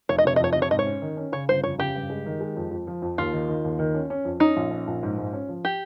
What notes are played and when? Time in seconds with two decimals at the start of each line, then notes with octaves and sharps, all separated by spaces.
0.09 F1 C#5
0.18 D#5
0.25 C3 C#5
0.36 D#5
0.40 F2 C#5
0.53 C3 D#5
0.62 C#5
0.71 G#2 D#5
0.79 C#5
0.87 C#4
1.02 D#3
1.17 C#4
1.32 C#3 C#5
1.49 G1 C5
1.63 F2 C#5
1.79 C#3 G4
1.95 G2
2.10 G#3
2.26 D#3
2.41 G#3
2.56 F2
2.71 F2
2.87 F3
3.02 F2
3.18 D#2 F4
3.33 D#3
3.49 D#3
3.64 D#2
3.79 D#3
3.94 C#4
4.10 C#4
4.25 F2
4.40 C#4 D#4
4.56 A#1
4.71 C#4
4.87 A#1
5.03 G#2
5.18 G#2
5.33 C#4
5.49 F3
5.65 G4